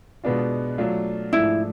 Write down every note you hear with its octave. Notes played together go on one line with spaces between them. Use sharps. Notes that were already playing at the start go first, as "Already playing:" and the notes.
B2 G#3 B3 D4 F4
F#3 A3 D4 F4
G#2 F3 A3 D4 E4